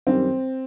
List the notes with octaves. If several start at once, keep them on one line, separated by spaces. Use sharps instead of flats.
F#2 D#3 G3 C4